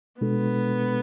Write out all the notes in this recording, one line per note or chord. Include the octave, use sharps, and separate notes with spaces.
B2 G#3 B3 D4 F#4 A4